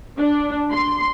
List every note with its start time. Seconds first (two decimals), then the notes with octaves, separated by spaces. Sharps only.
0.18 D4
0.72 C6